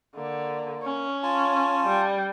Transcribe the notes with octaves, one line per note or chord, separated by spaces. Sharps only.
D3 A#3
C#4
F4 G#5 A5
G3